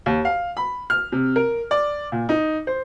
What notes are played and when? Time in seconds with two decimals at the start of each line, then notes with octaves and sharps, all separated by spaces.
0.06 D#2
0.25 F5
0.57 B5
0.90 F6
1.12 C3
1.36 A#4
1.71 D5
2.12 A#2
2.29 D#4
2.67 C5